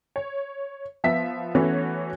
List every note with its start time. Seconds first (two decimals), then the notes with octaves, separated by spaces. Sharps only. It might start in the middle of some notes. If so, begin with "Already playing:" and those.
0.16 C#5
1.04 F3 B3 E5 B6
1.55 E3 A3 B3 C#4 F#4 C#5